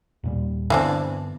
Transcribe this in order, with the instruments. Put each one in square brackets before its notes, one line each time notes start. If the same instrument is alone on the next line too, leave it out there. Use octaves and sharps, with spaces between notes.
[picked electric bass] D#2 A#2 G3
[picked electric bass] G2 D3 B3 [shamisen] E3 C4 D4